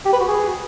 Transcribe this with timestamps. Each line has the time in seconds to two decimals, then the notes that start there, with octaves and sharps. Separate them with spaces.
0.06 G4
0.13 B4
0.20 F#4
0.28 G#4